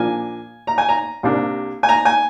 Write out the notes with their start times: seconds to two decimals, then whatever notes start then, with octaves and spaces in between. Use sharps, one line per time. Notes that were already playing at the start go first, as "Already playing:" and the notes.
Already playing: A#2 F3 A#3 D4 G#5
0.67 A#5
0.78 G#5
0.89 A#5
1.23 C2 C3 G3 A#3 D4
1.83 G#5
1.89 A#5
2.05 G#5